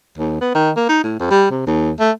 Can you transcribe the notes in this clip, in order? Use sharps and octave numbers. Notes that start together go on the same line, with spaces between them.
D#2
B3
D#3
A#3
D#4
A2
F2
G3
C3
D#2
A3